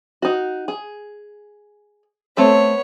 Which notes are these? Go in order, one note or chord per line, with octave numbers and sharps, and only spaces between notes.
D#4 F#4
G#4
A3 B3 C4 A4 C#5